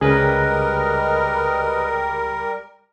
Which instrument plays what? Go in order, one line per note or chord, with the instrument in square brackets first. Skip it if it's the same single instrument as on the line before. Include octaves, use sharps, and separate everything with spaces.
[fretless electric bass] C#2 [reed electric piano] C#3 G#4 [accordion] G3 A#4 [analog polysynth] B4 D#5